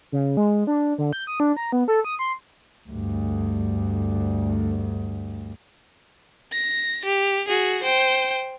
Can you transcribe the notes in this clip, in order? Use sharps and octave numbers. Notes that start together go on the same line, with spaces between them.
C#3
G#3
D4
D3
G6
D#6
D4
A#5
B3
A4
D#6
C6
D2 G2
A#6
G4
F#4 G#4
C5 G5